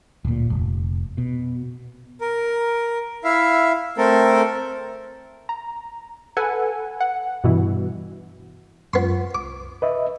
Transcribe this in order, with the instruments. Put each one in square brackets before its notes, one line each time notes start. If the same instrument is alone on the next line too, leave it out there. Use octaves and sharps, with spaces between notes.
[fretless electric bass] D1 A#2
F1
B2
[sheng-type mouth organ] A#4
E4 E5 F5
A3 C4 A4 A#4
[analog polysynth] A#5
A4 B4 F#5 G#5
F#5
G2 B2 E3
[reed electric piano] F#2 F4 [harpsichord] B3 C6
[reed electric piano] C2 [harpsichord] D6
[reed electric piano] B4 D#5 E5